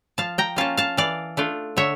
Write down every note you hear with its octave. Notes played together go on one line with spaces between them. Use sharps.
F3 F5 A5
G5 A#5
A#3 C#4 F4 F5 A5
F5 A5
E3 D5 F5
A3 D4 F4
D3 C#5 E5